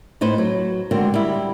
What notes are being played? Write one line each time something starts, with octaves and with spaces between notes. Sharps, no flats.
A2 D#4 B4 C5
F#3
D3 G#3 C4 F#4 A#4
G3 E4